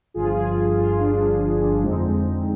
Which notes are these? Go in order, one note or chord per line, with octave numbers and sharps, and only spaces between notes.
G1 G2 F3 F4 G#4
F4 G#4
F4 G#4
D4 F4
F2 D3 G#3 C4 D#4